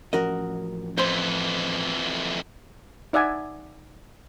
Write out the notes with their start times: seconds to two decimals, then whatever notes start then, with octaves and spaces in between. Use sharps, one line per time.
0.13 A1 F3 C#4 F#4 A#4 D#5
0.98 F2 E3 C5 C6
3.13 D#4 D5 E5 F#5 G#5